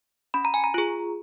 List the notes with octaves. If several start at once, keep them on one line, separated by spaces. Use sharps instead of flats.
C#4 B5
A#5
G#5
A#5
F4 G#4